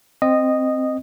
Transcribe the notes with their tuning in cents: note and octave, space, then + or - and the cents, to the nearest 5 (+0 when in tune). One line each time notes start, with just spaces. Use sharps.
C4 +0 D#5 -10